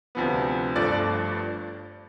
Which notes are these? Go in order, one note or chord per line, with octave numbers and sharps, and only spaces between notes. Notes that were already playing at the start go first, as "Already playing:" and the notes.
D2 C3 F3 B3
G1 G2 F3 A3 D5